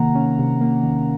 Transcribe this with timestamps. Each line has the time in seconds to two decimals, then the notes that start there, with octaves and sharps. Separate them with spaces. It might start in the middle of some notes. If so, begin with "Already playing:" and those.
Already playing: C3 D#3 A#3 F#5 A#5
0.15 C#4
0.39 C3
0.61 A#3
0.83 D#3